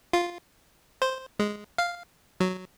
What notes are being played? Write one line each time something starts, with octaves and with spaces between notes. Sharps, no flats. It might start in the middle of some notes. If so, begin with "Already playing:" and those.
F4
C5
G#3
F5
F#3